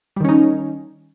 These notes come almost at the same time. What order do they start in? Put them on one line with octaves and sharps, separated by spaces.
G3 D#3 C#4 D#4